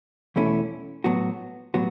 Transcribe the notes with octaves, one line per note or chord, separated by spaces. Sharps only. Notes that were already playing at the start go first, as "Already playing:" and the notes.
E2 B2 A3 C#4 E4
A2 F#3 B3 F#4
A2 F#3 B3 F#4